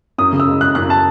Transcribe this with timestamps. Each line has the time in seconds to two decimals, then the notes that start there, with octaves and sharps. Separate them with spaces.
0.18 F#2 D#6
0.32 C#3
0.40 E6
0.48 G#3
0.61 G#3 F#6
0.75 F#2 F#6
0.90 A5